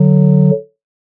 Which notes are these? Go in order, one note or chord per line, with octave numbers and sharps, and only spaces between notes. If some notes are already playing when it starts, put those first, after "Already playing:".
Already playing: D3 F#3